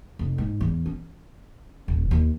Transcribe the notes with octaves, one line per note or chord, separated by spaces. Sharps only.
F1
G#2
E2
C#4
D#1
D#2